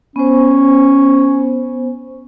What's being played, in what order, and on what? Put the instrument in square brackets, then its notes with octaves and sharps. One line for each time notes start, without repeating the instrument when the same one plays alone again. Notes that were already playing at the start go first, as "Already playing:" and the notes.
[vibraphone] B3 C5 [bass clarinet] C#4